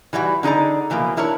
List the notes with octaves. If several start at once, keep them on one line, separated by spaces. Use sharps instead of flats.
E3 G3 E4 F#4
D3 D#4 G#4 D5 A#5
B2 E3 F3 A#3
D4 E4 A#4 B4 C#5